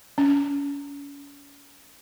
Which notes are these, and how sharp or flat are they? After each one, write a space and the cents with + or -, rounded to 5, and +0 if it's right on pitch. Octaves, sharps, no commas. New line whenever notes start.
C#4 +40